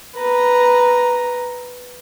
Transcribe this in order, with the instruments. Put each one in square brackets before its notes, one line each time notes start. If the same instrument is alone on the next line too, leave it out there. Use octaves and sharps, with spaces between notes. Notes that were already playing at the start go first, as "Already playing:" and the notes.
[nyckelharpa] B4 A#5